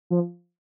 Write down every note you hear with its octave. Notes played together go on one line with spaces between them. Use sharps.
F3